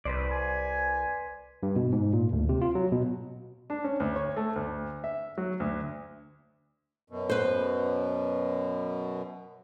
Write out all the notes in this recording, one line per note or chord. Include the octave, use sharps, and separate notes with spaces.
C2 B4 C5 D5
G#5
G2
B2
G#2
A#2
D2
C3
F4
F#3
B2
D4
C#4
D2
C#5
A3
D2
E5
F#3
D2
F#2 B2
B4 C5